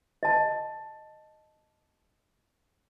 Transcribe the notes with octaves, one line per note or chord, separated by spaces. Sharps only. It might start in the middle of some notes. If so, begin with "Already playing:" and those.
D#5 A5